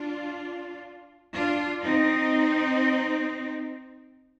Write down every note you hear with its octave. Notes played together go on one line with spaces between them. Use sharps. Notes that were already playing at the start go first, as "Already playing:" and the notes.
Already playing: D4 F4
D4 F4
C4 D#4